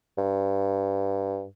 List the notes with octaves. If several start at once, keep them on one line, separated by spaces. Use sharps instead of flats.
G2